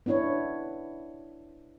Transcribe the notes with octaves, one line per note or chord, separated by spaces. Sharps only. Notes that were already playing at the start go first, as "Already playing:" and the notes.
B3 D4 E4 B4 C#5